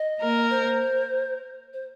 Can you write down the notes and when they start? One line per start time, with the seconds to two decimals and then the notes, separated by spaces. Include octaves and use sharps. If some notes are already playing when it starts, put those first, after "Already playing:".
Already playing: D#5
0.20 A#3 A#4
0.50 C5
1.73 C5